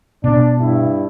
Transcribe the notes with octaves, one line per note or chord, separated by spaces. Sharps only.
B2 D4
G2 E4